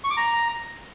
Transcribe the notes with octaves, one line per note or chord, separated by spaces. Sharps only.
C#6
D6
A#5